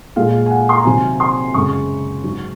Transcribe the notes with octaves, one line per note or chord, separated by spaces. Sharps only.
A#2 G#3 F5
G#5
F#5
C6
A#5
C3 D#3 F#3 G#5
C6
F#2 C#3 G#3 C#6
G#2 F#3